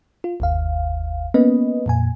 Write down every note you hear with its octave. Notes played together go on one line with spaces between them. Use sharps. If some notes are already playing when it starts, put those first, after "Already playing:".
F4
G1 D#2 F5
A#3 B3 C#4 B4 D#5
F2 A#2 G#5